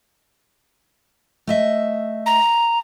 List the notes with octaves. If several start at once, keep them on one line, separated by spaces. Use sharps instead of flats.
A3 D#5 E5
A#5